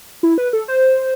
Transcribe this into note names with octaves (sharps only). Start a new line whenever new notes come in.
E4
B4
A4
C5